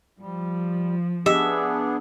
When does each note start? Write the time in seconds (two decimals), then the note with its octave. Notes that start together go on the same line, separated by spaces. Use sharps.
0.19 F3 G3
1.26 B3 D4 G4 G#4 D#5 E5